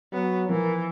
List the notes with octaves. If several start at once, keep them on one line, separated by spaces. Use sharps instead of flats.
F#3 B3
E3 F3 A#4